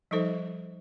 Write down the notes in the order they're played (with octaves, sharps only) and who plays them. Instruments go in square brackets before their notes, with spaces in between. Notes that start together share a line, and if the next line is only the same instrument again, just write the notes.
[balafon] F3 G3 D#4 A4 C5